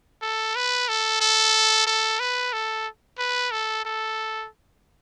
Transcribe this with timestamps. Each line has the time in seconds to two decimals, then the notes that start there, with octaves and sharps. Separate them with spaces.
0.22 A4
0.55 B4
0.88 A4
1.21 A4
1.87 A4
2.20 B4
2.53 A4
3.19 B4
3.51 A4
3.85 A4